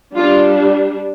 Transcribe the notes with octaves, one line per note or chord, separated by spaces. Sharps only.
G3 D4 F4